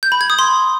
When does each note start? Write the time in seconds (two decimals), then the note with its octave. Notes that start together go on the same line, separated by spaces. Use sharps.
0.03 G6
0.12 B5
0.21 G#6
0.30 D#6
0.39 C6